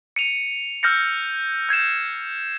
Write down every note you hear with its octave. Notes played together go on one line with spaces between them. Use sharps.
C#7 D#7 F7
E6 F6 G6 A#6 C#7
G6 G#6 C7 E7